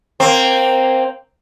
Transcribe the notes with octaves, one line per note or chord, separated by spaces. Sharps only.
A#3 C4